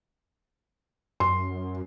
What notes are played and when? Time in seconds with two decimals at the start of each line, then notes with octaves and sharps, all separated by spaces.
1.20 F#2 C6